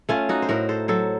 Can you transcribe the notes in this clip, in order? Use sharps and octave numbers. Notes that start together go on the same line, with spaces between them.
A3 C#4 F4
D#4 F#4
C5
A2 F#4 A#4
A4 C5
F#3 A4 C5